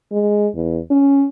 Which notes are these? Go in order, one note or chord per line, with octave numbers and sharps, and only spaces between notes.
G#3
E2
C#4